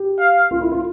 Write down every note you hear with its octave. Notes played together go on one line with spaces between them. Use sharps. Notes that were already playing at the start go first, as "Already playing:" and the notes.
Already playing: G4
F5
F4
E4
F4